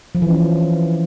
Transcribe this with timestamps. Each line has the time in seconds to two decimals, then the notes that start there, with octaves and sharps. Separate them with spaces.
0.15 F3
0.22 E3
0.29 C#4